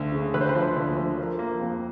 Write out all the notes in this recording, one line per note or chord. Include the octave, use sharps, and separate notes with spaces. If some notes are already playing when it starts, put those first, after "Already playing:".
Already playing: D2
C#3
D2 B4
C5
B4
F3
D2
F3
F3 A#4
A#3
F2